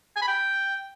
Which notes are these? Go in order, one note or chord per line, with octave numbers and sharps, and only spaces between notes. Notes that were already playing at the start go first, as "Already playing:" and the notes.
G#5
B5
G5